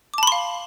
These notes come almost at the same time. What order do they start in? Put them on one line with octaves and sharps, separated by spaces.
D6 A5 B5 C6 F5